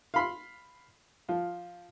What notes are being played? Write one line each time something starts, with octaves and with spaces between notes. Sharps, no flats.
F5 B5 C6
F3 F4